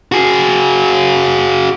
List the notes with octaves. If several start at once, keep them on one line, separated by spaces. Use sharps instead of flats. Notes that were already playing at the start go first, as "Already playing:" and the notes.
F#4 G#4